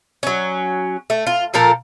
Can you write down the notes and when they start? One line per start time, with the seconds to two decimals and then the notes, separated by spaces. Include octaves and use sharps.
0.23 F#3 C#4
1.10 A3
1.27 F4
1.54 A#2 F3 A4 A#4